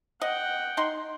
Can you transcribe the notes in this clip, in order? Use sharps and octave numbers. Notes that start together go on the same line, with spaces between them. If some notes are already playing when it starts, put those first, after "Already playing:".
D#5 F#5 G5
D#4 C6